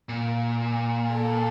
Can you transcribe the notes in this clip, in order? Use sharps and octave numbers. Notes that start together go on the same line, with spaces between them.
A#2
A4